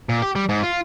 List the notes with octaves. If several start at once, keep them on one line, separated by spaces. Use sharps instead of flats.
A#2
G4
G3
G#2
F4